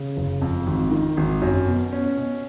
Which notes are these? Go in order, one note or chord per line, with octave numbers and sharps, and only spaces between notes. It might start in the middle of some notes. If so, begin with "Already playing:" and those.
Already playing: C#3
F#1
F2
G#1
D#3
G#1
F#2
B2
C#4
B2